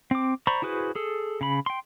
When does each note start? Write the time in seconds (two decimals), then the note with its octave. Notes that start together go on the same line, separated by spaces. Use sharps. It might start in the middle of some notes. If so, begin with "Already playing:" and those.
0.11 C4 D6
0.47 C5 D5 A#5 B5 C#6
0.62 E4 F#4 G#4 B4 C5
0.95 G#4 A4
1.41 C#3 B5
1.66 G5 C6